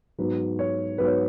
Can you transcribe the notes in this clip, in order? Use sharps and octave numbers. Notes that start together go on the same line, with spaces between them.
G#2 F#3 B3 B4
C#5
G#2 F#3 B3 B4
C#5